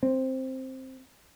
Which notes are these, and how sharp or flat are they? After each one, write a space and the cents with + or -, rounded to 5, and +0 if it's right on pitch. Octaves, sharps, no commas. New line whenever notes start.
C4 +5